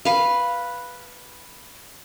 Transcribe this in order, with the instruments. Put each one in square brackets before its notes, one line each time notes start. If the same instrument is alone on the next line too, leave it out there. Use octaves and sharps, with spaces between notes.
[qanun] B4 F5